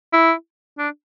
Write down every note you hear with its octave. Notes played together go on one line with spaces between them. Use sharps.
E4
D4